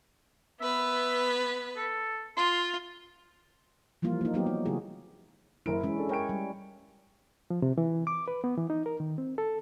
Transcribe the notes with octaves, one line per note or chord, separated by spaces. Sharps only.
B3 B4 E5
A4
F4 C6
E3 F3 G3 A#3 F4
A#3 D#4
F#3 G3 B3 C4 D#4 G4
D#4
C#3 F#3 A3 E4 F#4 G#4
F#1 E4 A#4 D7
E3 G#3 C#4
D4 A4
A#4 C#5 G5 D7
G3
F3
C3
E3
D6
B4
B3
E3
D#4
A#4
D#3
C4
A4